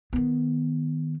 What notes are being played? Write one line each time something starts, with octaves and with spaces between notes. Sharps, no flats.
D#3 B3